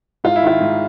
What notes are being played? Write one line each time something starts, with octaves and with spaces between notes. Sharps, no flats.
G#2 F4
E4
D#3 F4
G#2